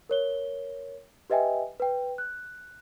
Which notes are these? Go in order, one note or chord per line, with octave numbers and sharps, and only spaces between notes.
A#4 C#5 G7
G4 B4 D#5 E5 G5 G#5
B4 G5
F#6